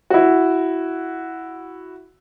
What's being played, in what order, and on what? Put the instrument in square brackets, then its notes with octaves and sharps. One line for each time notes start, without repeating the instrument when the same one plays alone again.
[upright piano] E4 F#4